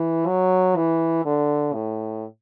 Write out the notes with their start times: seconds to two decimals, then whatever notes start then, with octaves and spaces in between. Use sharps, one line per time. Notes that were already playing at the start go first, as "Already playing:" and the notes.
Already playing: E3
0.27 F#3
0.76 E3
1.25 D3
1.73 A2